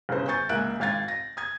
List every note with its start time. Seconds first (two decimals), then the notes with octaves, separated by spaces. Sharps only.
0.09 G1 C#3 C5
0.28 G#5 C#6 G6 A6
0.49 C#2 A#3 E5 G#5 F#6 D7
0.80 G#1 F5 G#6 A6
1.08 A#6
1.37 D#6 G#6